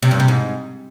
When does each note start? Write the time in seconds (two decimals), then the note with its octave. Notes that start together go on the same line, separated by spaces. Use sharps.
0.03 C3
0.11 G2
0.20 C3
0.28 G#2